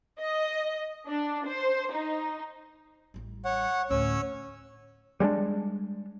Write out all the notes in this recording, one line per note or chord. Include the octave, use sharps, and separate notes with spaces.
D#5
D4
C5
D#4
A1 G3
C#5 F#5
D2 A2 C#4 C#5 E6
G3 G#3 C4 D4